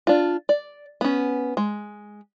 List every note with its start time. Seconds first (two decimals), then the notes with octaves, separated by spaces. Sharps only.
0.07 D4 F4
0.49 D5
1.01 B3 C#4
1.57 G#3